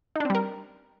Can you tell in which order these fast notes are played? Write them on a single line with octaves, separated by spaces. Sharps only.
D#4 D4 C4 G3 A#4